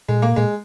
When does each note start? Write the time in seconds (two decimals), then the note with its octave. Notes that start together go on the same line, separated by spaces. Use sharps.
0.08 A#2 G#3
0.22 A#3
0.36 A#2 G#3